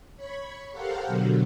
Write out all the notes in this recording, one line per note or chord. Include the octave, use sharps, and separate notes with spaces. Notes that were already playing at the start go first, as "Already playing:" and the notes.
C#5 B5 C#6
G4 A4 A#4 C5 F5 F#5
B2 D3 F#3